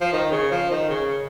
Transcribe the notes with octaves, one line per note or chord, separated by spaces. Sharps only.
F3
D#3
C#3
F3
D#3
C#3